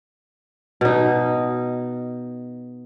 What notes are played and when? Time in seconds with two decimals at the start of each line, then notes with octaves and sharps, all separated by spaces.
0.81 B2 D#4